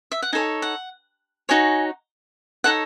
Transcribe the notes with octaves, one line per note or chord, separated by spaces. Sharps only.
E5
F#5
D#4 A4 C#5 G#5
F#5
D#4 F#4 C#5 G#5
D#4 A4 C#5 F#5